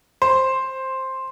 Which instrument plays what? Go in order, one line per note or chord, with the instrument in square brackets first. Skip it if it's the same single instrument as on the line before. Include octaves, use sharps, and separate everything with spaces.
[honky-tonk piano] C5